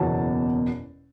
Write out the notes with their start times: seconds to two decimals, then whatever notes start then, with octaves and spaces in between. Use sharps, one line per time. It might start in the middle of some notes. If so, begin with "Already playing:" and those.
Already playing: F#1 E2 B2 F#3 A5